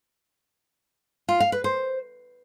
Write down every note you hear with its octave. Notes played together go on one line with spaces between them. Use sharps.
F4
F5
B4
C5